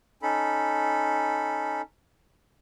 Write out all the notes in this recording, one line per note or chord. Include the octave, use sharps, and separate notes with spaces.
C#4 D#4 A4 B5